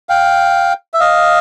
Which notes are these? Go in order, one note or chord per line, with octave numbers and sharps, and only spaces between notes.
F5 G5
E5
D#5 F5